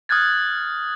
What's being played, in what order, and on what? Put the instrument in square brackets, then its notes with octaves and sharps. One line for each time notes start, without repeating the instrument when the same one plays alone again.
[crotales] D#6 F6 F#6 G#6 A6